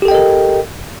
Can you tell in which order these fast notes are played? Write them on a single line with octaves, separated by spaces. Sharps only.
G4 A4 G5 D#5 A#4